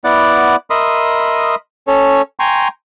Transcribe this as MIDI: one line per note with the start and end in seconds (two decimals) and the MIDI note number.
0.04 0.56 59
0.04 0.56 64
0.04 0.56 74
0.04 0.56 78
0.04 0.56 86
0.70 1.55 70
0.70 1.55 75
0.70 1.55 76
0.70 1.55 83
0.70 1.55 84
0.70 1.55 87
1.87 2.22 61
1.87 2.22 69
1.87 2.22 73
2.40 2.68 79
2.40 2.68 80
2.40 2.68 82
2.40 2.68 84
2.40 2.68 85